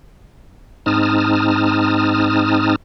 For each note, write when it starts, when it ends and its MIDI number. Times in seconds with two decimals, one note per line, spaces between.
0.86 2.75 44
0.86 2.75 60
0.86 2.75 63
0.86 2.75 81
0.86 2.75 87
0.86 2.75 89